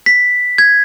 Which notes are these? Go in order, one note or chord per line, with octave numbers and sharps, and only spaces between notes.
B6
G#6